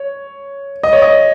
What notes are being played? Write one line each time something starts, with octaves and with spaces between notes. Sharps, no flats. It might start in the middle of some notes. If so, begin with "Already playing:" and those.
Already playing: C#5
D#5
C#5
D#5